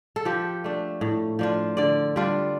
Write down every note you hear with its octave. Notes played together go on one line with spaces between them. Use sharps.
A4
F3 G4
A3 D4
A2
F3 D4 F4
D3 D5
G3 D4 F4